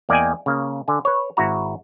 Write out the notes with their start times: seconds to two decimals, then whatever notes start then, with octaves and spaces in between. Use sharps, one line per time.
0.09 E2 A#3 D5 D#5 G5 G#5
0.46 C#3 A#3
0.88 D3 G#5
1.05 B4 C#5
1.37 G#1 E4 F#4 A#5